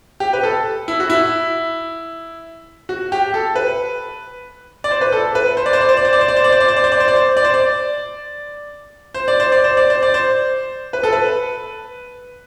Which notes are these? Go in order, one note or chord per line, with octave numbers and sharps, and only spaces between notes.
G4
B4
A4
E4
F#4
E4
F#4
G4
A4
B4
D5
C5
B4
A4
B4
C5
D5
C5
D5
C5
D5
C5
D5
C5
D5
C5
D5
C5
D5
C5
D5
C5
D5
C5
D5
C5
D5
C5
D5
C5
D5
C5
D5
C5
D5
C5
D5
C5
B4
A4
B4